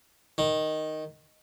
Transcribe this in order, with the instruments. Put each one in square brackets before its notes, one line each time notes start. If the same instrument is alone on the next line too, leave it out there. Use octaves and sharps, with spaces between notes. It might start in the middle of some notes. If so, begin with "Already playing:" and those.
[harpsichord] D#3